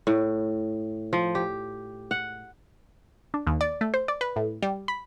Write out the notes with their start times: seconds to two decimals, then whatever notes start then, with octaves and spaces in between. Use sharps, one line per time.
0.07 A2
1.13 F3
1.35 G4
2.11 F#5
3.34 D4
3.47 D#2
3.61 D5
3.81 A3
3.94 C5
4.08 D5
4.21 B4
4.36 A2
4.63 G3
4.88 B5